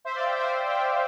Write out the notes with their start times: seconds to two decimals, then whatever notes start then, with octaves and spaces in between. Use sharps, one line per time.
0.05 C5 E5
0.15 D5 F5
0.26 E5 G5
0.37 C5 E5
0.49 E5 G5
0.70 E5 G5